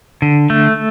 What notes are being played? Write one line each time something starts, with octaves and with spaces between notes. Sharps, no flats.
D3
A3